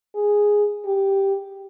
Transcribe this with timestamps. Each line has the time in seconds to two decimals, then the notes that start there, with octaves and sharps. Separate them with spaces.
0.15 G#4
0.86 G4